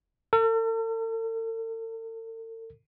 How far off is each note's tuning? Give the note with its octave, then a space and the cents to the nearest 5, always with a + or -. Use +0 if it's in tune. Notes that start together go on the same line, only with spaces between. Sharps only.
A4 +45